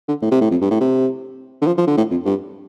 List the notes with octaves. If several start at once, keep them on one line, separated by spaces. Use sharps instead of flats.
D3
A2
C3
A2
F2
G2
A2
C3
D3
F3
F3
D3
A2
F2
G2